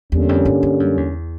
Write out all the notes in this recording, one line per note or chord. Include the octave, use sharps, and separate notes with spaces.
E2 D3 G3 A#3 C#4
F2
G2
G2
F#2
E2